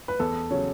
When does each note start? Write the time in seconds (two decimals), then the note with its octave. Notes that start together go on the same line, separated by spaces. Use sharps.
0.08 B4
0.20 E2 A4
0.51 C#3 F#3 C#5